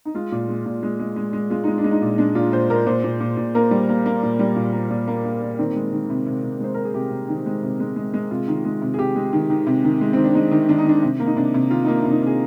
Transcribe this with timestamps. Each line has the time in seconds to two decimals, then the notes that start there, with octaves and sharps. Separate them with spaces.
0.05 D#4
0.15 G#3 F4
0.32 A#2
0.48 G#3
0.66 A#2
0.83 G#3
0.99 G#3
1.16 G#3
1.33 G#3
1.50 G#3 F4
1.64 G#3 D#4
1.78 D4
1.84 G#3
1.91 D#4
2.02 A#2
2.18 G#3 D4
2.35 A#2 F4
2.52 A#2 C5
2.70 A#2 A#4
2.87 A#2 C5
3.04 A#2
3.20 A#2
3.37 A#2
3.55 A#3 A#4
3.71 G3
3.89 A#3
4.06 A#3
4.23 A#2
4.39 G3
4.56 A#2
4.73 A#3
4.90 A#2
5.08 A#3
5.25 A#3
5.42 A#3
5.59 D#3 C4
5.76 G#3
5.93 D#3
6.10 C3
6.27 C3
6.44 C3
6.60 G#3 C5
6.74 C3 A#4
6.85 G#4
6.94 C3 G4
7.11 C3
7.29 D#3
7.46 G#3
7.63 C3
7.80 G#3
7.96 G#3
8.14 G#3
8.31 C3 F4
8.48 D#3
8.65 G#3
8.82 C3
8.94 G#4
8.98 C3 G4
9.16 G#3
9.33 D#3
9.50 D#3
9.67 C3
9.84 D#3
10.01 G#3
10.13 D#3 C4
10.24 D4
10.34 G#3 D#4
10.51 D#3
10.69 D#3 D4
10.78 D#4
10.85 D#3 D4
11.02 C3
11.20 A#3
11.26 D#4
11.37 C3 D4
11.54 C3
11.70 D#3 F4
11.85 A#3 D#4
11.97 D4
12.05 C3
12.11 D#4
12.21 C3
12.26 G#4